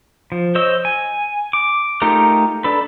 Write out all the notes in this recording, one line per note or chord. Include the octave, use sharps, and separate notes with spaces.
F3
C5 C#5 D#5 E6
G#5
D6
A3 D#4 F4 G4 A#4
D4 A4 B4